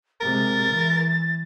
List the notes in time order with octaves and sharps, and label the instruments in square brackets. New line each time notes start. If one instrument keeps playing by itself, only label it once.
[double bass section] C3 G#3 [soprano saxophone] A#4 [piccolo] A6
[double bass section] E3